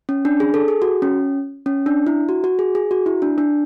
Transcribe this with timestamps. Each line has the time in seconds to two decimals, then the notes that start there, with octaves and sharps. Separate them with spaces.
0.09 C#4
0.25 D4
0.40 G#4
0.54 A4
0.68 G#4
0.82 F#4
1.02 C#4
1.66 C#4
1.86 D4
2.07 E4
2.29 F#4
2.44 F#4
2.59 G#4
2.75 G#4
2.91 F#4
3.06 E4
3.22 D4
3.38 D4